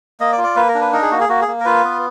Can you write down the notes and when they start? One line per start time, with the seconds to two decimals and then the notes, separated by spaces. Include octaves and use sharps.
0.20 A#3 D#5
0.32 D5
0.38 F4
0.44 D5
0.56 A#3 B4
0.68 A#4
0.75 D4
0.81 B4
0.93 D#4 A#4
1.02 G#4
1.11 A#3 F#4
1.20 G#4
1.29 A#3 F#4
1.41 G#4
1.48 A#3
1.60 A#4
1.65 F4 B4
1.84 B3